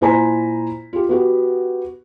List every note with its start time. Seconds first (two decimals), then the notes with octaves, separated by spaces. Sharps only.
0.01 A#2 E4 C5 G#5 A#5 B6
0.93 F4 G4
1.09 B3 F#4 G4